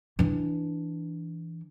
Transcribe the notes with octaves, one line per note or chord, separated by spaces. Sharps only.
E3 D4